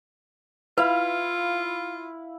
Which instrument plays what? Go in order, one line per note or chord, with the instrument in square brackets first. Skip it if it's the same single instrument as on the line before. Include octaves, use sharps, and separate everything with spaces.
[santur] E4 F5 B5 [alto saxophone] F4 [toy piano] B4